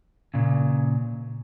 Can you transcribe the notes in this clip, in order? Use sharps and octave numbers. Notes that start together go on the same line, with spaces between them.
A#2 C#3